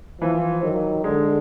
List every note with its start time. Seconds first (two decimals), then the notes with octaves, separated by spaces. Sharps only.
0.21 E3 F3
0.63 D#3 F#3
1.04 D3 G#3